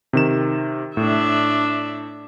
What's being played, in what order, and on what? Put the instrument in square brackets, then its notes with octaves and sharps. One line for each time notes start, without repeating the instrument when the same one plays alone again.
[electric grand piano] C3 D#3 E7
[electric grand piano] A2 [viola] D4 E5